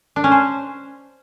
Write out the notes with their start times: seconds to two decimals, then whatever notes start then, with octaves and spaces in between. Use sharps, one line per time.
0.16 D4
0.24 C#4
0.31 C5